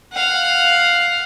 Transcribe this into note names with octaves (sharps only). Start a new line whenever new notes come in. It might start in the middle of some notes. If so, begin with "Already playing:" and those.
F5 F#5